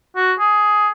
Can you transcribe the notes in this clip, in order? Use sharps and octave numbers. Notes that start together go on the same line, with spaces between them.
F#4
G#4